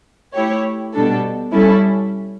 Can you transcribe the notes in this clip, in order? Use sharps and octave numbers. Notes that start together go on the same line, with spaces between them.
A3 E4 G4 C#5
B2 G3 D4 A4
G3 C#4 E4 A4